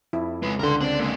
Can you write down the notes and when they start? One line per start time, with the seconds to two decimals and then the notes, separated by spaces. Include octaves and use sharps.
0.13 F2 E4
0.42 C#3 G#3 B4
0.59 C#2 D3 A4 A#4 C6
0.81 C4 D4 D5
1.00 C3 G#3 A#3